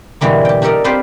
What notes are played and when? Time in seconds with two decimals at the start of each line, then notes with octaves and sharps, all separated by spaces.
0.21 G#2 B2 D3 E3 G3 A#3
0.45 G4 G5
0.62 D4 G4 A4 A#4 D5 D#5
0.84 C4 F4 G4 B4 C5 D5